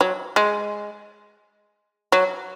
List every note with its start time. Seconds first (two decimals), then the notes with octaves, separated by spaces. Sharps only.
0.01 F#3
0.36 G#3
2.12 F#3